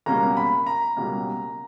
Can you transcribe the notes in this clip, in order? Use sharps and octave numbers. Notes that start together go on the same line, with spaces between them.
C#2 B2 G3 A#3 C#4 A#5
B5
A#5
C#2 B2 G3 A#3 C#4